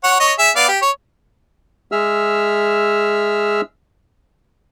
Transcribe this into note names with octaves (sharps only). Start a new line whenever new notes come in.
C#5 F#5
C#5 D#5
G#4 E5
B3 D5 F5
G4
C#5
G#3 G#4 E5 E6 F6